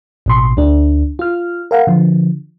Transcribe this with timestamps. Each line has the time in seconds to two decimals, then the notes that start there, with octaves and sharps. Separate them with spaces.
0.26 A1 B2 C6
0.57 D2 D4
1.19 F4 F6
1.71 A#4 F5 F#5
1.87 D3 F3